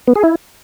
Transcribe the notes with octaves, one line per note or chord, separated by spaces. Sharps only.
B3
G#4
E4